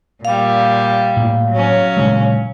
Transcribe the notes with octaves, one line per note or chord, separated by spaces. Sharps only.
A#2 G3 F5
A2 A#3
F#3 C#4
A#2 C#3 G#3